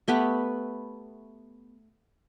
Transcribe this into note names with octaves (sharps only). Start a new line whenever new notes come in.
A3 B3 G4 B4